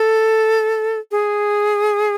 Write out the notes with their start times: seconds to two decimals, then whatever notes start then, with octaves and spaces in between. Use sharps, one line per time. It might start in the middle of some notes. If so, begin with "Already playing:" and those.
Already playing: A4
1.11 G#4